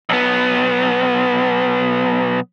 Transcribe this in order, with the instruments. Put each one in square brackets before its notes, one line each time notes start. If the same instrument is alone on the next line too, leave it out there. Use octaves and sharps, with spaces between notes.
[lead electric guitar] B1 B3